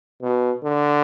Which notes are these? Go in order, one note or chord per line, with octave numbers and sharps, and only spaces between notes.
B2
D3